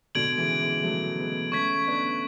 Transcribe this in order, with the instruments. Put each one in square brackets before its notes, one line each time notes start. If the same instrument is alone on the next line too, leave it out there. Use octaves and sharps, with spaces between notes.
[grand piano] B2 D3 [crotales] G#6 D7 F#7
[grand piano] C#3 E3
E3 G#3
F#3 A3
G#3 B3
[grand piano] A3 C#4 [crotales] C#6 G#6 B6
[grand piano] B3 D4